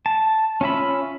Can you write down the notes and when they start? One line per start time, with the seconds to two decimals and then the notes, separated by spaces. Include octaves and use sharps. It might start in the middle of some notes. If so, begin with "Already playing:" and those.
0.06 A5
0.61 C#4 F4 E5 B5